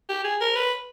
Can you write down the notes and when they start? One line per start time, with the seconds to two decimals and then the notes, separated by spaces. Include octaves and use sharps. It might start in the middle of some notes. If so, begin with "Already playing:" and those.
0.09 G4
0.24 G#4
0.41 A#4
0.56 B4